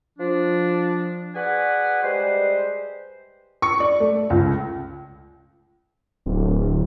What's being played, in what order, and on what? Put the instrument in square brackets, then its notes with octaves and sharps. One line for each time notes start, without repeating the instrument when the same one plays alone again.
[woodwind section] F3 D4
F#4 G#4 B4 D5 F#5 G#5
G3 G#3 B4 C5
[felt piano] C#6
D5
A3
C#2
[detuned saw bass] D1